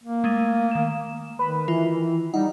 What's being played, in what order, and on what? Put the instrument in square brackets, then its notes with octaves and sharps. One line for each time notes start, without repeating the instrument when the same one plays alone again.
[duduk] A#3
[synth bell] G#3 A3 D#7
D#3 E7
[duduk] D#3 [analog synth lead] B4
[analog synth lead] E3 [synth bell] F4
[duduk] G3 [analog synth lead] D#4 [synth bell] F#5